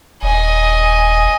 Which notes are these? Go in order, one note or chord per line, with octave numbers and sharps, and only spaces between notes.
D#1 D#5 G#5